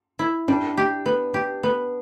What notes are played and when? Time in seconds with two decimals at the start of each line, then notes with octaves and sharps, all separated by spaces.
0.19 E4
0.48 G3 D4
0.77 G4
1.06 B3
1.34 G4
1.63 B3